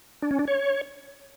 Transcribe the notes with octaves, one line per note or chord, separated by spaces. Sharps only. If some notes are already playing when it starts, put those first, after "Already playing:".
D4
C#4
D4
C#5